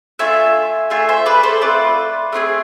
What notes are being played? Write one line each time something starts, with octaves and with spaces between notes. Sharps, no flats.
A3 D4 F4 E5 G#5
A3 D4 F4 E5 G#5
C5 E5
B4 D5
A4 C5
A3 C4 F4 B4 D5
A3 C4 F4 G#4